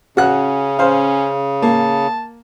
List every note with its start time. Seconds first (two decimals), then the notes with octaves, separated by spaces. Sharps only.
0.17 C#3 C#4 F#4 F#6
0.79 C#4 C5 F5
1.62 A#3 A5